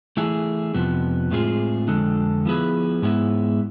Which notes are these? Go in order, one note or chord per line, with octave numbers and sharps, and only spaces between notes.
E3 A3 E4 G#4
F2 C3 F3 B3
A2 G#3 C4 F4 G#4
F2 D3 G#3 D4 A4
F3 B3 E4 G#4 B4
G#2 G#3 B3 E4